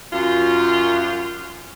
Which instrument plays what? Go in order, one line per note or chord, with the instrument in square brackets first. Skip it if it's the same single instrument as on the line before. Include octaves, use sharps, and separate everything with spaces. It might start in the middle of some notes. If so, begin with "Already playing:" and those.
[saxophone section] F#2 F4